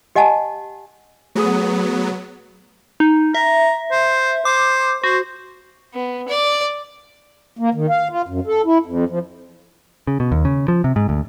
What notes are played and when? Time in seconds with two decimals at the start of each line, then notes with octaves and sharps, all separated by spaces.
0.16 G4 D#5 F#5 G#5 A5
1.35 F#3 A3 B3 G#4 D#6
3.00 D#4
3.35 E5 A#5
3.92 C5
4.45 C5 D6
5.04 F#4 C5
5.94 B3
6.28 D5
7.59 A#3
7.75 D#3
7.90 F5
8.11 F4
8.28 F#2
8.47 A4
8.65 E4
8.86 F2
9.09 F3
10.07 C#3
10.20 B2
10.32 D#2
10.45 C#3
10.68 F3
10.84 C3
10.96 G#2
11.09 D2